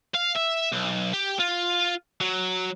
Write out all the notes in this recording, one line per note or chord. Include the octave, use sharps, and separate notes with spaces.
F5
E5
B1
G4
F4
F#3